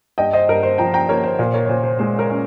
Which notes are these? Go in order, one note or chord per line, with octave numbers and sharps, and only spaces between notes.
G2 D#5 G5
C5 D#5
G2 A#4
C5
F3 G5 A#5
G5 A#5
A#3 A#4 C#5
C5
A#2 C5
A#4 C#5
C#5
A#2 C5
C5
G#3 C5
A#4 C#5
C#4